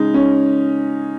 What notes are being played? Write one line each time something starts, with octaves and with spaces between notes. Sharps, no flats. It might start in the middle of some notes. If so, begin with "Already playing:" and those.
Already playing: C#3 G#3 D#4
C#4